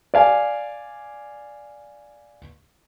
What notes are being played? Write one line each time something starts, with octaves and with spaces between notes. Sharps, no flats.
D5 F5 G#5